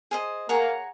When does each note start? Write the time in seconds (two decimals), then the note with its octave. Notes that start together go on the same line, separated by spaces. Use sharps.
0.11 G#4 C5 D#5
0.49 A#3 G#4 C#5 F#5 A#5